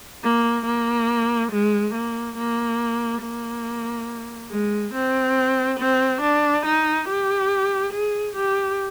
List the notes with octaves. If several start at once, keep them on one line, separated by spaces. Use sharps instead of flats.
A#3
A#3
G#3
A#3
A#3
A#3
G#3
C4
C4
D4
D#4
G4
G#4
G4